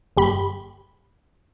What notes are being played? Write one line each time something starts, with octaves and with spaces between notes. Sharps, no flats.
G1 G4 B5